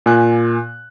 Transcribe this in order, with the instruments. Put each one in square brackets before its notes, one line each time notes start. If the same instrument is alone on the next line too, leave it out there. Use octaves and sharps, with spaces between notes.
[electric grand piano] A#2 G#5 F#6